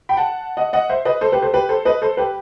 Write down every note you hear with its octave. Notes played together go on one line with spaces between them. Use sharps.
G5 B5
F#5 A5
D#5 F#5
D#5 F#5
C5 E5
B4 D#5
A4 C5
G4 B4
A4 C5
G4 B4
A4 C5
B4 D#5
A4 C5
G4 B4